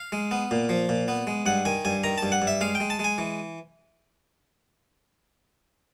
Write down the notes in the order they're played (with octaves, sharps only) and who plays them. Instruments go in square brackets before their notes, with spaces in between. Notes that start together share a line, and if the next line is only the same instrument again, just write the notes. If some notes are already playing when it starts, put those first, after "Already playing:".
Already playing: [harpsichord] F5
G#3
B3
A#2
F3
A#2
B3
G#3
G2 F#5
D#3 G#5
G2 G#5
D#3 A#5
G2 A5
F#5
G2
E5
G#3 F5
G5
G#3
A5
G#3 G#5
E3